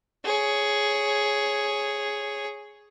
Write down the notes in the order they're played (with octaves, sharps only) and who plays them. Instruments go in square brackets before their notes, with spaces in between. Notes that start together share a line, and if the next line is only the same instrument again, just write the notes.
[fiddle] G#4 C#5